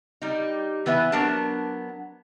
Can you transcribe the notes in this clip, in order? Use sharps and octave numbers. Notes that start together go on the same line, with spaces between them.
G3 D#4
E3 B3 B4 E5
F#3 B3 D4 A#4 A5